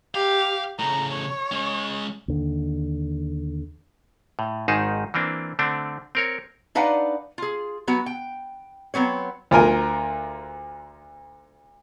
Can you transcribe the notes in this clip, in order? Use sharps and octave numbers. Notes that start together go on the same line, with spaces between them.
G4 F5
A2 C#3 A#5
C#5
G#3 C#4
D#2 D3
A2
G#1 G#2 D#3 D#4 G#4 A5
E3 A#3 C4 D4
D3 A3 C4 D4
C4 A#4 C#5
D4 D#4 B4 D5 F5 F#5
F4 G#4
F#3 B3 F#4
G5
F#3 B3 C4 C#5
D2 F4 A#4 G#5